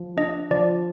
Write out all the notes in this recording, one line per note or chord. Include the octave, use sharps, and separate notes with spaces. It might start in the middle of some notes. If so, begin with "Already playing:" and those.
Already playing: F3
D4 D#5
F3 D5